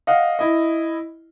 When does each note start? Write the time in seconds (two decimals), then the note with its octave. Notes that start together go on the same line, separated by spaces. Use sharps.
0.07 D#5 F5 F#5
0.39 E4 D#5